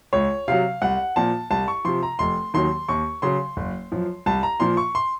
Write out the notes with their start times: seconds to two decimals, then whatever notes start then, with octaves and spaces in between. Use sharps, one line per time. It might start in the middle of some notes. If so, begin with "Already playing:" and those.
0.13 C#2 C#5
0.48 C3 F#3 F5
0.82 C2 F#5
1.16 A#2 F3 A5
1.51 C2 A5
1.68 C#6
1.85 C3 F3 C6
2.03 A#5
2.19 F1 C6
2.54 D#2 D#3 F#3 C6
2.89 D#2 C#6
3.22 C#3 F#3 C6
3.57 F#1
3.92 F#2 F3
4.26 C2 A5
4.43 A#5
4.60 A#2 F3 C6
4.77 C#6
4.95 C6